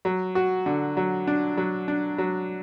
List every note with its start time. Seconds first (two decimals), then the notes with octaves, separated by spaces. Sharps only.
0.05 F#3
0.35 F#4
0.66 D3
0.97 F#3
1.27 D4
1.57 F#3
1.88 D4
2.18 F#3